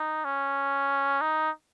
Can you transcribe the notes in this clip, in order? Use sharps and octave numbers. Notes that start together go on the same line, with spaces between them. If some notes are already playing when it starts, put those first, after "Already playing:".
Already playing: D#4
C#4
D#4